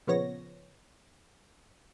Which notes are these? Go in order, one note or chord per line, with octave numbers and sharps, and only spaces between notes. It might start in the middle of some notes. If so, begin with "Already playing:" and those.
A#2 C#3 F3 B3 C#5 A#6